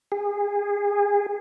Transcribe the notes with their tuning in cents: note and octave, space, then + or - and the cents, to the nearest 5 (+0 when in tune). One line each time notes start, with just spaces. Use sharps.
G#4 -30